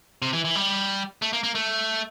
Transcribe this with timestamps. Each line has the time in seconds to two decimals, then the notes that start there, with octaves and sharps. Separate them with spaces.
0.22 C3
0.33 E3
0.45 E3
0.55 G3
1.22 A3
1.33 A#3
1.43 A#3
1.55 A3